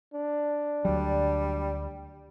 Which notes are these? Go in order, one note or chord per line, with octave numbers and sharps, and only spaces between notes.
D4
D2 F#3 G3